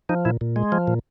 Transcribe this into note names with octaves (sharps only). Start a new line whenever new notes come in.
F3 D#4
A#2 E4
A#2
G#3
F3
A#2